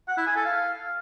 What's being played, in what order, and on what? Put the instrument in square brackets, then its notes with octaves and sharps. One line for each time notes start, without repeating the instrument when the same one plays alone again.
[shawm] F#5
E4
G#5
A4
F5